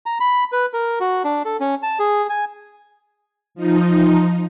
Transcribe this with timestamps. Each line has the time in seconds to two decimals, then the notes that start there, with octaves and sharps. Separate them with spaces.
0.06 A#5
0.20 B5
0.52 B4
0.73 A#4
1.00 F#4
1.24 D4
1.45 A4
1.60 C#4
1.83 A5
1.99 G#4
2.30 G#5
3.55 F3 D#4